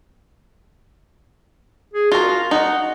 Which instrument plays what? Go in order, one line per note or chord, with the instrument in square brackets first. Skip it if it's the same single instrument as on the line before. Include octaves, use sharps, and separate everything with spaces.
[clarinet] G#4
[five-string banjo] F4 A#4 [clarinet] F#4
[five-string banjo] D#4 [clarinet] F#5